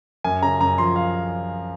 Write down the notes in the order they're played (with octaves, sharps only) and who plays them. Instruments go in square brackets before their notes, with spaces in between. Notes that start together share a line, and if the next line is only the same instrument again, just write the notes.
[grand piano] F#2 G#5
C#3 A#5
F#2 A#5
F3 C6
F5